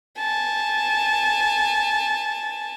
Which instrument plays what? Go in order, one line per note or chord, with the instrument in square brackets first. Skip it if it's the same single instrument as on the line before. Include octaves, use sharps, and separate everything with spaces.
[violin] G#5 A5